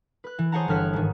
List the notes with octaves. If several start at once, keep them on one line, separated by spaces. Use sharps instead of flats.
B4 F#6
E3
G#4 C5 C#5 F#5 A5 A#5
G1 E3 C#5 F6 F#6 B6
G#2 D#3